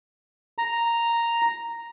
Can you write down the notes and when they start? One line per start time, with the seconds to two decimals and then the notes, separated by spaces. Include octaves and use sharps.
0.58 A#5